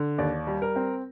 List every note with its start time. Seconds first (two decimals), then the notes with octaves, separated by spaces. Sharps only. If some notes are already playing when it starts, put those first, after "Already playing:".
Already playing: D3
0.18 D#2 D5
0.47 G3
0.62 A#4
0.76 C4